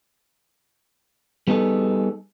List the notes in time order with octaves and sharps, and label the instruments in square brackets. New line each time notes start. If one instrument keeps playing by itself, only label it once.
[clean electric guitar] G3 B3 D#4 G#4 A4